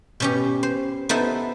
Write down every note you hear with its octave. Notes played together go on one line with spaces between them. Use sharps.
B2 C#4 G4
C5
B3 D#4 E4 A4 B4 C5